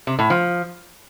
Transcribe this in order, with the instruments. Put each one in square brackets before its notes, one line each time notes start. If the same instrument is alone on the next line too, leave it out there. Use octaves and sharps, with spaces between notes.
[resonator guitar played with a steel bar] C3
A2
F3